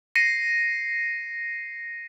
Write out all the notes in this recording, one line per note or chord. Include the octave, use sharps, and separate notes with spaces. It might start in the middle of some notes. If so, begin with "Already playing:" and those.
A#6 C7 C#7 D#7